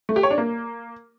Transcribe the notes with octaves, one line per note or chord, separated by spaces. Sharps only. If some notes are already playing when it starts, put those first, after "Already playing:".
A3
G4
C#5
D4
A#3